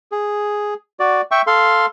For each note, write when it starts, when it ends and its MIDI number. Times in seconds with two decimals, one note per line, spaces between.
0.12 0.74 68
1.00 1.21 66
1.00 1.21 74
1.31 1.42 76
1.31 1.42 79
1.31 1.42 85
1.47 1.86 69
1.47 1.86 77
1.47 1.86 84